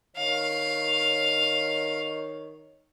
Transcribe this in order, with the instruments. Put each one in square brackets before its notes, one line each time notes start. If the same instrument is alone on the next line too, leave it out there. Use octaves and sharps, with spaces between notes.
[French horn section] D#3 C#5 [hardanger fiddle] F5